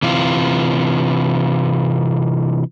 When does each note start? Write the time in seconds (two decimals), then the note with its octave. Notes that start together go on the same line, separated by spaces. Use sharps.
0.03 C3 E3 F4